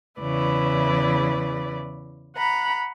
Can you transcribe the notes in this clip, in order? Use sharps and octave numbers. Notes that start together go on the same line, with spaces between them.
E2 C#3 E4 B4 D5
F#5 A#5 B5